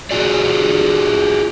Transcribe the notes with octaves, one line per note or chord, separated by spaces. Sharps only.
F4 F#4 G#4 D5